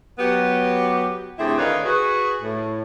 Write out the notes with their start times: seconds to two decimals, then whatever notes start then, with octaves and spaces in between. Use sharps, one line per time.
0.19 F#3 B3 G4
1.39 A2 D3 C4 E4 G4 G#4
1.58 D3 D#3 D#4 B4 C#5 F5
1.85 F#4 G#4 B4
2.41 A2